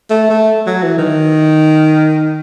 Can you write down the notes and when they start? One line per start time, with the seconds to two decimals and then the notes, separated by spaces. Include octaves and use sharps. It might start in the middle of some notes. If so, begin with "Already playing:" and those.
0.10 A3
0.30 A3
0.67 F#3
0.82 E3
0.98 D#3